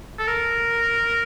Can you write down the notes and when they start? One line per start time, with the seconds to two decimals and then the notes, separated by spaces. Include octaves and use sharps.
0.19 A4
0.27 A#4